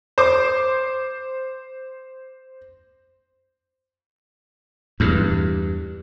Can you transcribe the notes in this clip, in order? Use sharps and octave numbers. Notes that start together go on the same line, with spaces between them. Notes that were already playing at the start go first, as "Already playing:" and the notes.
C5 D6
E2 G2